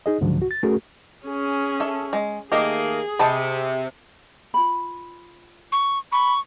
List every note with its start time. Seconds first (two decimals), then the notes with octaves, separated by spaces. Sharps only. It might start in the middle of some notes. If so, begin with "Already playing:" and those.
0.06 D#4 G#4 D#5
0.21 C#2 G#2 D3 F3 F#3
0.38 C2 F#4
0.51 A6
0.63 A3 C#4 F#4 G#4 A#4
1.26 C#4 G#4
1.80 A4 E5
2.13 G#3
2.52 D#3 A3 A#3 G4 G#4 D#5
3.19 C3 D#5 A5 B5
4.54 F4 B5
5.72 C#6
6.12 B5 C#6